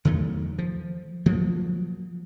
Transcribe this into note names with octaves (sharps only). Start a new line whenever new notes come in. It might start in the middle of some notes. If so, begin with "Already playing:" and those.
E2 D#3 F#3 A3
F3
F3 F#3 A#3